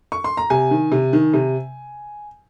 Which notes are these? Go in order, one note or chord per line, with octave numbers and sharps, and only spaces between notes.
C#6
C6
A#5
C3 G#5
D#3
C3
D#3
C3